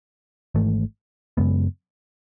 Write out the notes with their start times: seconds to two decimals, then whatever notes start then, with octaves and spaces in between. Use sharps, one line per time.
0.55 G#1 G#2 E3 A3
1.37 F#2 C#3 G#3 B3